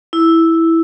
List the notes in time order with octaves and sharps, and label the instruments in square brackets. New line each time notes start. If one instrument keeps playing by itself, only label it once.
[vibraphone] E4